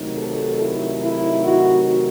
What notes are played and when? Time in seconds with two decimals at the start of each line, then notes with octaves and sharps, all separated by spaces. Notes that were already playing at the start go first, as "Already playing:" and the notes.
Already playing: C3 D#3 F#3 A3 D#4
0.17 A4
0.60 E4
1.02 E4
1.44 F#4